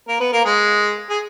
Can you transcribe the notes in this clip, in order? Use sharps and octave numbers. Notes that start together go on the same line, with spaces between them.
A#3 A#4
B3 B4
A#3 A#4
G#3 G#4
G#4